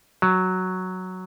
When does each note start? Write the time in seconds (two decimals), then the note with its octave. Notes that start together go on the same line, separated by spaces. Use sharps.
0.22 F#3